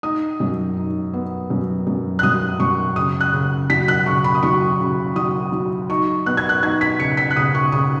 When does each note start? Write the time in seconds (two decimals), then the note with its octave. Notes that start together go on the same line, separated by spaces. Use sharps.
0.03 D#4 D#6
0.40 F#2
0.77 D#4
1.13 B3
1.50 F#2
1.87 F#2
2.19 F#6
2.23 F#2 D#6
2.60 F#2 C#6
2.96 C#3 D#6
3.20 F#6
3.33 C#3
3.70 F#3 B6
3.88 F#6
4.06 C#3 C#6
4.24 B5
4.35 D#6
4.43 F#3 C#6
4.80 C#3
5.16 F#3 D#6
5.52 F#3
5.89 D#4 C#6
6.26 B3 F#6
6.37 G#6
6.49 F#6
6.63 D#4 G#6
6.81 B6
7.00 C#3 C#7
7.17 B6
7.31 F#6
7.36 C#3 D#6
7.55 C#6
7.72 C#3 D#6